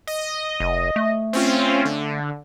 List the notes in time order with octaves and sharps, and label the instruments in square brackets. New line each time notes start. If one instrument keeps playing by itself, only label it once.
[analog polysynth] D#5
[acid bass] F1
A3
[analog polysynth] C4 C#4 F4
D3